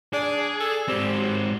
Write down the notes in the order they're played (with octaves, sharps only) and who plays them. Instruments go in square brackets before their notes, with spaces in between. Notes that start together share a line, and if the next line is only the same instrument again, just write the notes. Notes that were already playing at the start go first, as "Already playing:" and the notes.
[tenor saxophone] D4 [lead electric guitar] G#4
[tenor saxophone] A4
[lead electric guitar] G#2 C4 [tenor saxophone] G3
[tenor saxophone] F#3